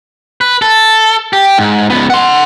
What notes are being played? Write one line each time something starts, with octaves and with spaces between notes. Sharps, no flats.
B4
A4
G4
G#2
C#2 B3
F#5 C6